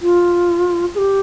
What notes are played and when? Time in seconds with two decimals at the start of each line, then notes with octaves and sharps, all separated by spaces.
0.02 F4
0.95 G#4
0.98 G4